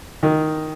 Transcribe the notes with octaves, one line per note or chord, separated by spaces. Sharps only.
D#3